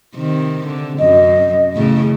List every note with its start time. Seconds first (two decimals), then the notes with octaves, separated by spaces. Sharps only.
0.15 C3 D#3
0.67 D3
0.99 F#2 D#5
1.73 E2 A2 C#3